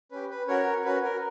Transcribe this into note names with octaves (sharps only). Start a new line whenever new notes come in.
C#4 G4 B4
B4
C#4 F#4 A#4 C#5
C#4 F#4 B4
A#4